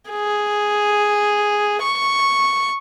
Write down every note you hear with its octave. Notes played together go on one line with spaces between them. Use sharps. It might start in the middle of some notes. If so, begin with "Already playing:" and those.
G#4
C#6